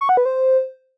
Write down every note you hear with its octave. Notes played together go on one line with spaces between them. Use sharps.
C#6
F#5
B4
C5